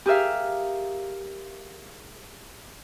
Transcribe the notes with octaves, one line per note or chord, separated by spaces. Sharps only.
G4 G#4 A#4 E5 F5